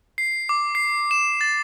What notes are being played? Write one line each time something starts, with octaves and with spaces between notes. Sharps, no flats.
C7
D6
C7
E7
A6